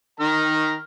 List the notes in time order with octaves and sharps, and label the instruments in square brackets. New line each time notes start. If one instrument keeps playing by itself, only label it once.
[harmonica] D#3 A#5 F6